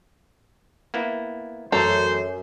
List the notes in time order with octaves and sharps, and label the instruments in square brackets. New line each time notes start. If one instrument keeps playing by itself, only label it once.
[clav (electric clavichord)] A#3 B3 E4
[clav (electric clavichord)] A1 C#5 A#5 [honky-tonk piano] F#2 [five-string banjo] A4 [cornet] C5